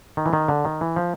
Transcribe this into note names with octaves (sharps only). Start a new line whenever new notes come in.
D#3
E3
D#3
D3
D#3
E3
F3